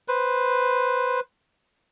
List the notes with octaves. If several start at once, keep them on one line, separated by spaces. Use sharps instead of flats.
B4 C5